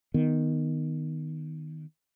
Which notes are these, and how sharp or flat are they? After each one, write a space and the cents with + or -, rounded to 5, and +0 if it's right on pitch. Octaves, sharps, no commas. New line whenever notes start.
D#3 +0 B3 +0